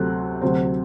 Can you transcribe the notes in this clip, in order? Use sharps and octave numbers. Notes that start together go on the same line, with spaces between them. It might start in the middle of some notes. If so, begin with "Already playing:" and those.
Already playing: D2 C3 F#3 A3 C4 F#6
D2 C3 F#3 C4